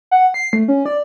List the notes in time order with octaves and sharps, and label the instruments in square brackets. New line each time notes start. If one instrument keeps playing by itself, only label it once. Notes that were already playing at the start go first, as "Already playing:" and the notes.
[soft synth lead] F#5
C7
A3
C#4
D5